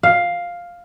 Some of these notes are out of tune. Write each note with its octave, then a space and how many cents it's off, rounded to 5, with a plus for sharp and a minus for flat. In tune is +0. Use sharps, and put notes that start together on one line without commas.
F5 +5